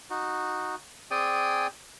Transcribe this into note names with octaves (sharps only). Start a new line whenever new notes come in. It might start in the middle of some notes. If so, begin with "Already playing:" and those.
D#4 F#4
C4 G#4 D5 G5 G#5 D#6